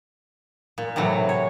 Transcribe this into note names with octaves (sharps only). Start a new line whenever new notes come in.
A#2
A2 C3 E3 F#3
C#5